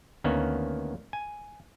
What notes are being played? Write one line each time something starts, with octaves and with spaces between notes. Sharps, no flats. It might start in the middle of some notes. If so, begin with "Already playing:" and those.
D2 D#3 A#3 B3 C#4
G#5